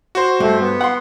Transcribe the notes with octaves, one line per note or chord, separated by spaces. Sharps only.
F#4 C5
G2 A3
B3
F#5 C6